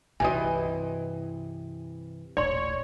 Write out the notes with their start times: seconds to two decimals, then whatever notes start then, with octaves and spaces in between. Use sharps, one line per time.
0.20 C2 G2 C3 E3 F#4 D#5 G#5
2.37 D#1 A1 C#5 D5 C6